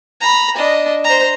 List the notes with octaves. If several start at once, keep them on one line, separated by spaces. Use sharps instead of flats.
A#5 B5
D4 D#5
C5 A#5